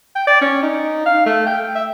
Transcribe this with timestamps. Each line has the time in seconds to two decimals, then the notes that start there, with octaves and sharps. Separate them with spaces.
0.15 G5
0.27 D5
0.41 C#4
0.63 D#4
1.06 F5
1.26 A3
1.46 G5
1.75 E5